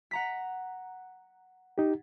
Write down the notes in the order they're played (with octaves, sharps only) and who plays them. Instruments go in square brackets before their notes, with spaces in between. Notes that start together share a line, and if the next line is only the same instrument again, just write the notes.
[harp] F#5 A#5 B6
[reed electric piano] D#4 G4